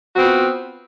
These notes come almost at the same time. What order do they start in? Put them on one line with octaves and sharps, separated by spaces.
F#4 C4 B3 F4